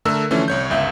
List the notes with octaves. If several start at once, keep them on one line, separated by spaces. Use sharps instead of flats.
D3 A3 A4 A#4 E6
D3 E3 F3 A3 C#4
C2 C#5 G6
G1 C#2 E5